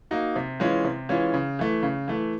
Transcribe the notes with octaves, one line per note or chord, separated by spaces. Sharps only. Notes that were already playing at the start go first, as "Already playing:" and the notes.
A#3 D#4 F#4
C3
E3 G#3 C#4 F4
C3
E3 G#3 C#4 F4
C#3
E3 A3
C#3
E3 A3